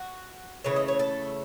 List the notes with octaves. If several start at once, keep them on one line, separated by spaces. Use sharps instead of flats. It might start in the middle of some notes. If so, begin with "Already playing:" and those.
Already playing: F#4
C#3 E3 A3 C#5
D#5
C#5
A4